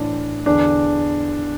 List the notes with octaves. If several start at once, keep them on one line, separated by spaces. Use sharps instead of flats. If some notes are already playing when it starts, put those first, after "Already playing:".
Already playing: A2 E3 D4
E2 D3 D4